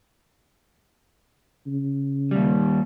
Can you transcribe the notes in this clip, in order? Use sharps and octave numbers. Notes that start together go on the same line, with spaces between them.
C#3
D#2 G3